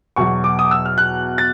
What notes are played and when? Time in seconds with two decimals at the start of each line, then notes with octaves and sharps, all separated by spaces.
0.16 E2 B2 F#3 C#6
0.44 D6
0.59 D#6
0.71 E6
0.85 F6
0.98 F#6
1.38 A6